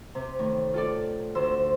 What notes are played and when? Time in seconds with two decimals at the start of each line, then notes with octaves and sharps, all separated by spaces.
0.15 C3
0.39 A2 D#3
0.74 F4 A4 D5
1.35 D2 C5 E6